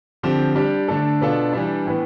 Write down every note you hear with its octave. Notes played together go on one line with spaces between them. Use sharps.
D3 F3 C4 G4
G3 D4 G4
D3 A3 D4 A4
B2 B3 D4 F4 A4
E3 G3 D4
A2 E3 B3